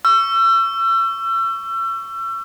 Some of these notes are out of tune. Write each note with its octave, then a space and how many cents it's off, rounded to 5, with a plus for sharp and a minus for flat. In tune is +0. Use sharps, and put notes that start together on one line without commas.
C#6 +15 E6 +35